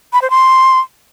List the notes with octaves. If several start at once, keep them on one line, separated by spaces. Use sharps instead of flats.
B5
C5
C6